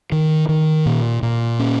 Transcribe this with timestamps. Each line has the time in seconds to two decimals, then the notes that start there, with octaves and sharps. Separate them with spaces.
0.12 D#3
0.49 D#3
0.86 A#2
1.23 A#2
1.60 C#4